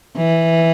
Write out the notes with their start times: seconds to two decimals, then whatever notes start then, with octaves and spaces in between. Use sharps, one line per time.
0.17 E3